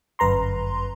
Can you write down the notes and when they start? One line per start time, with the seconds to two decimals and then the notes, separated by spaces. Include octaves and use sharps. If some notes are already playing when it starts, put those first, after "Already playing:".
0.19 G1 F#2 B4 A#5 C6